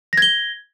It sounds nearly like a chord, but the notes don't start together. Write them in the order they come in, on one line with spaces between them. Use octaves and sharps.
A#6 G#6 G7